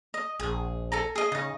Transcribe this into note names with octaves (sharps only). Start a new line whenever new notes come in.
D#5
A#1 G#4
A4 G#5 A#5
G#4 D#5
C#3 D#4 D#5